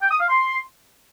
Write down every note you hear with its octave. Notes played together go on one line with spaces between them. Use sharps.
G5
D#6
F5
C6